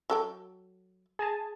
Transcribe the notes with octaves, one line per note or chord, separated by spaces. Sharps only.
F#3 A4 G5
G#4 G#5 A5